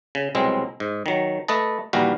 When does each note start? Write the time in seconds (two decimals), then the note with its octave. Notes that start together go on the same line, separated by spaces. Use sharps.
0.15 C#3
0.35 C2 B2 F#3 G#3 C4
0.80 G#2
1.06 D#3 F#3
1.48 A3 B4 D#5 A5
1.93 A#1 D#2 E3 G3 F#4 F5